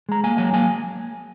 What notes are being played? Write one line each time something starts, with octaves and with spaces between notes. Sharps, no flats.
G#3 A#5
A#3 G#5
F#3 G#5
A#3 G#5